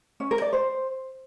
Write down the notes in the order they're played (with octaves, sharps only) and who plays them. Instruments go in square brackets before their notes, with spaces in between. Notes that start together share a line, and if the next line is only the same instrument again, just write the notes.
[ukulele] C#4
A#4
D5
C5